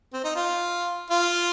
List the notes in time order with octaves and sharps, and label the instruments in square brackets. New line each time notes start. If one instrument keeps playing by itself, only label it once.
[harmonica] C4
D#4
F4
F4